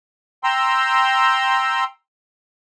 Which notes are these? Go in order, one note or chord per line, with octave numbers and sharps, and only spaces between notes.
G5 A#5 C6 E6